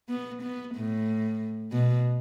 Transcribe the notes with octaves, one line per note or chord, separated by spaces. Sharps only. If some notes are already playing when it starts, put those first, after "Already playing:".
B3
B3
A2
B2